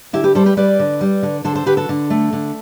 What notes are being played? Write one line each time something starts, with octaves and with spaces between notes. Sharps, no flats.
D3 E4 G4
G4 B4
G3 A4 C5
G4 B4
G3 B4 D5
D3
G3
D3
D3 A4 C5
A4 C5
D3 G4 B4
F#4 A4
D3
A3
D3